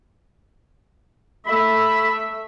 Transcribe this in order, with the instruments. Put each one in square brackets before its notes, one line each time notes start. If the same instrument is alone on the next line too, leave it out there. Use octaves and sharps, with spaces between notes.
[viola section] A3 E5 [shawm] B5